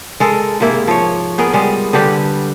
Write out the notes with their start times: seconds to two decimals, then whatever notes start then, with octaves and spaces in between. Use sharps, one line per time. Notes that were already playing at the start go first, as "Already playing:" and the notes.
0.20 G#3 A4 A#4
0.60 G#2 C3 A#3 E4
0.87 F3 C#5
1.38 B3 G#4 A#4
1.53 G3 G#3
1.93 D3 G3 G4 B4